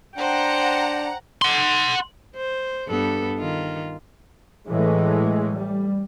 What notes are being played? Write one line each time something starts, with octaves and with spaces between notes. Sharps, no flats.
D4 C5 F#5 G5 A#5
F#5 C6
C5
G2 B3 A4
D#3 F4
A2 E3 G#3 A3
G3